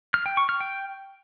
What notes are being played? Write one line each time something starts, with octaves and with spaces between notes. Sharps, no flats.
F6
G5
C#6
F6
G5